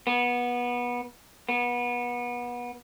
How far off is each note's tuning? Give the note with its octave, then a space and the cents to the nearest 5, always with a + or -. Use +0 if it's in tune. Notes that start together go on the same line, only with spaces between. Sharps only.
B3 -20
B3 -25